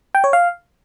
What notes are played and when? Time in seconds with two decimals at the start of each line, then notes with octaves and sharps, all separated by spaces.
0.15 G5
0.24 C#5
0.33 F5